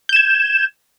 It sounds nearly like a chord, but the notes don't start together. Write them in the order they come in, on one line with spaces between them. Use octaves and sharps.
G6 E7 G#6